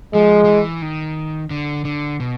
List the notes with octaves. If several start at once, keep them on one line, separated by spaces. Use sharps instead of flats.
F3 G#3
F3
E3
D#3
D3
D3
B2